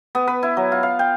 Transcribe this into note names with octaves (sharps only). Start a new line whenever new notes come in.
B3
B4
E4
F#3
F4
F5
G5